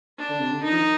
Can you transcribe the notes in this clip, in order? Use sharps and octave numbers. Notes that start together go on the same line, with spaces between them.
D4
D3
C3
D3
D#3 D#4
F3
D#3